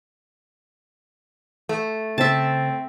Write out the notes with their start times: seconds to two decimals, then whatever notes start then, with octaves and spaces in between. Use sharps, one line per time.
1.69 A3
2.18 C#3 C4 C5 E5 A5